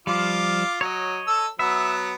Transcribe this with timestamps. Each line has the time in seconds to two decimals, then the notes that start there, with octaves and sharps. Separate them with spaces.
0.07 F3 G3 F4 F5 D6
0.81 F#3 C#5 D#5
1.27 A4 E6
1.59 F#3 B3 E5